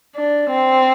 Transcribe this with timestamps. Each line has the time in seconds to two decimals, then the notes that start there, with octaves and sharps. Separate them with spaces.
0.17 D4
0.50 C4